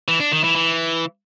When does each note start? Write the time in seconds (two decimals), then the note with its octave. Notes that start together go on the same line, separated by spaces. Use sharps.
0.08 E3
0.20 D4
0.32 D#3
0.44 E3
0.56 E3